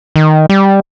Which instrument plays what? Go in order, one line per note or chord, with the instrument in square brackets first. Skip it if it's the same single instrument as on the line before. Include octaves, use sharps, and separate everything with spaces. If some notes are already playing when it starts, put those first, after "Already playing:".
[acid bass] D#3
G3